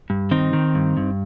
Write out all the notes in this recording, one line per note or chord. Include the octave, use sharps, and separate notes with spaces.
G2
D#3 C4 D#4
D#3
G2
G2